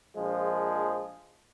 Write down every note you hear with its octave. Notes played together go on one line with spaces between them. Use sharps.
A#1 F3 G#3